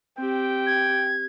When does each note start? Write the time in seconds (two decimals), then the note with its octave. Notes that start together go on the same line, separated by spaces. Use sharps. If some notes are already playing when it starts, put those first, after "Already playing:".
0.18 C4 G4 G5
0.67 G#6